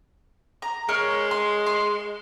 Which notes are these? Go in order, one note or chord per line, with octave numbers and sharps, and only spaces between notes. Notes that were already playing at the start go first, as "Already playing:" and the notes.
A#5
G#3 A#4 C#5 F6
C6
C6